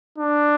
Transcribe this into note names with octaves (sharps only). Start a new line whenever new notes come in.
D4